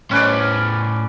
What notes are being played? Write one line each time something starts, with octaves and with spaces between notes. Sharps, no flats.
A2 C#4 B4 C5 D5